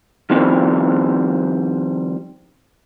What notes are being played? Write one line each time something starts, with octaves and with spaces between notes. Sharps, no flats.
D#3 F3 G3 C4